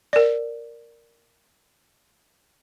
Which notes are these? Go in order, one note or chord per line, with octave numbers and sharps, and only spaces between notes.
A#4 D5